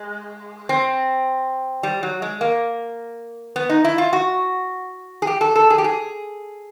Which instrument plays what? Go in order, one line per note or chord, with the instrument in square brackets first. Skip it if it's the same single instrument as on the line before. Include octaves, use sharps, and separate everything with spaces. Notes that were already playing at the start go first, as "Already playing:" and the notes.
Already playing: [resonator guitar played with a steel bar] G#3
C4
G3
F#3
G#3
A#3
B3
D#4
E4
F4
F#4
G#4
G4
A4
A4
G#4
G4
G#4